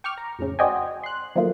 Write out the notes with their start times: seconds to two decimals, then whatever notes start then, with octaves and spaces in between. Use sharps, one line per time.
0.04 G5 C#6 D6 F6
0.18 A#5
0.39 F2 A2 C#3
0.59 F#4 C5 D5 D#5 G5 G#5
1.04 C6 F#6
1.36 D#3 F3 F#3 A3 A#3 F4